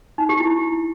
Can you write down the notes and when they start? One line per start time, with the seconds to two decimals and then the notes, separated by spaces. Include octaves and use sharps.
0.18 D#4
0.29 G4
0.40 E4